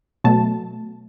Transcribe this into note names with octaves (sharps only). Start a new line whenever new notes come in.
B2 F#3 A3 A5